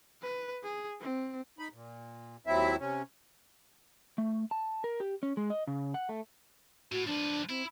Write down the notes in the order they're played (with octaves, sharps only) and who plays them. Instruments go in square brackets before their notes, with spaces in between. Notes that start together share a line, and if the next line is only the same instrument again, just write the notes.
[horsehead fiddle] B4
G#4
C4
[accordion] D#4 B5
A#2
D#2 F#3 C4 E4 E5
C3 C#4
[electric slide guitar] A3
A5
A#4
G4
C#4
G#3
D#5
C#3
F#5
A3
[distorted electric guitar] A2 [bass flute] F#4
[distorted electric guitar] F3 B4 [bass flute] D4
[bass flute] C4 [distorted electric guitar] E4